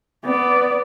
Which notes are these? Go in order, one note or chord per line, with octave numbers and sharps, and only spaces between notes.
B3 D5